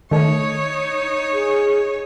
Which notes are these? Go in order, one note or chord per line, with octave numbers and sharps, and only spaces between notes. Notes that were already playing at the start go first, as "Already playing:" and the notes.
D#3 A3 D#4 C#5
G#4